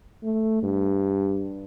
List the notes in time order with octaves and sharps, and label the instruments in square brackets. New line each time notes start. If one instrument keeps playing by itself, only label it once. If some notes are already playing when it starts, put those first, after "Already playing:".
[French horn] A3
G2